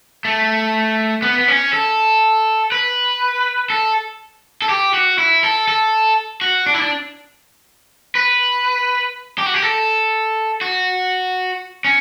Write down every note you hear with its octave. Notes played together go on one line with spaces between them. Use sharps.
A3
B3
B3
C#4
A4
B4
A4
A4
G4
F#4
E4
A4
A4
F#4
D4
E4
D4
B4
G4
F#4
G4
A4
F#4
C#4